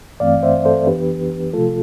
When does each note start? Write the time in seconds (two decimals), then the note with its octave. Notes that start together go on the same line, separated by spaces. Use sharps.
0.20 G2 E3 A3 C4 D5 F5
0.43 C5 E5
0.65 A4 C5
0.87 F2 E3 B3 D4 G4 B4
1.53 C3 F3 A3 F4 A4